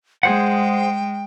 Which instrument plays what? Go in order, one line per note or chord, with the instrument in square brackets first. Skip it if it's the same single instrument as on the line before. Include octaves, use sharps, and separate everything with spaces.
[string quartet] G#3 [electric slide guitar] G#4 C5 F#5 [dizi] G5